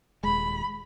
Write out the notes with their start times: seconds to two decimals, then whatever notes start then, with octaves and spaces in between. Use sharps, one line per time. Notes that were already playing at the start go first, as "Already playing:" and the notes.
0.23 D#1 G#3 B5